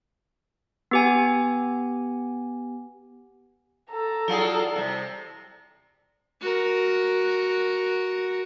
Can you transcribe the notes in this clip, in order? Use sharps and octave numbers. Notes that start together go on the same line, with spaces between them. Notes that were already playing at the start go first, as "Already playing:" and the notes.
B3 G4 G#5
A4 A#5
F#3 E4 F4 G#4 D5 A5
C3 G3
F#4 A#4